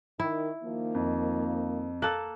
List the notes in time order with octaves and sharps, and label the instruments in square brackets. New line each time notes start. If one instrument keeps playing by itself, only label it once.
[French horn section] D#3 [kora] E4
[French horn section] D#3 F3 A#3
[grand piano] F2
[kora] A#3 A4 [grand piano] F#6 F#7